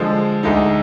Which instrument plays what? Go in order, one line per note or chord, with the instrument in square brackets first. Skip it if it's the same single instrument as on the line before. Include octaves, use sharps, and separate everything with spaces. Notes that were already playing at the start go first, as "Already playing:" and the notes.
Already playing: [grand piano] D3 F3 G#3
D2 D3 G#3 D#4